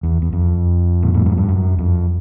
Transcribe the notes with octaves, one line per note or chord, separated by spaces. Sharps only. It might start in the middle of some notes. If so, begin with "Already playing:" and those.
E2
E2
F2
A#2
A2
G#2
G2
F#2
F2